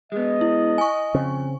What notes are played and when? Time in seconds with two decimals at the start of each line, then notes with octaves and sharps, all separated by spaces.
0.12 G#3 B3 D#5
0.41 E4
0.78 G#5 C#6
1.14 F2 C#3 C4